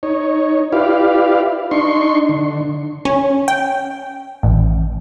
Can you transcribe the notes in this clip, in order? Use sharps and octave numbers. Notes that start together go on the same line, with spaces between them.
D#4 C#5
E4 F4 G4 B4 D5 F5
D4 D#4 C6 C#6
D3
C#4
G5
A1